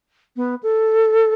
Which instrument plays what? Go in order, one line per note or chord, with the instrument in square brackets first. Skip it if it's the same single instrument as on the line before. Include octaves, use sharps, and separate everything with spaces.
[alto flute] B3
A4